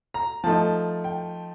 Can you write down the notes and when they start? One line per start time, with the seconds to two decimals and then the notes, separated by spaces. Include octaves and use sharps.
0.14 A#5
0.44 F3 A3 D#4 A5
1.04 G5